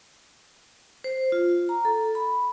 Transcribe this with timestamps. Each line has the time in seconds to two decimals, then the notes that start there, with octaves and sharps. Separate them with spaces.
1.04 C5
1.32 F4
1.69 A#5
1.85 A4
2.15 B5